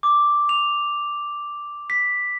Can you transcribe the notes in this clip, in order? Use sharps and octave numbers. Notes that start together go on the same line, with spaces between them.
D6
F7
B6